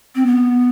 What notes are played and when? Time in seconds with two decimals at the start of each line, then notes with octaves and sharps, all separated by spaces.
0.15 C4
0.26 B3